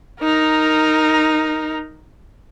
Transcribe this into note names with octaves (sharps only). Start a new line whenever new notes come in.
D#4 A#4